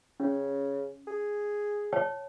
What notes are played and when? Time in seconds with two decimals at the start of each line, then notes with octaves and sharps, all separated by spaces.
0.20 C#3 C#4
1.07 G#4
1.93 C#5 G5 A5